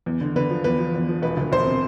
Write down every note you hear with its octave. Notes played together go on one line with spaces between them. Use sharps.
E2
D3
D3 B4
F3
E2 B4
F3
E2
F3
E1 B4
D2
E1 C5
C3